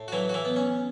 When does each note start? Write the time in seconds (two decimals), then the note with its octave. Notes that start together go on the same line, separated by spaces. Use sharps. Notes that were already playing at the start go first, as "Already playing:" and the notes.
Already playing: A2
0.08 F#4
0.12 E3 F#3 E4
0.29 F#4
0.34 E3 E4
0.45 B3
0.56 C#4